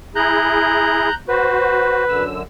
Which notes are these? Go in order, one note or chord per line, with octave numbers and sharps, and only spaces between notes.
E4 G#4 A#5 F#6 G6
F#4 B4 C5
F#2 D3 E6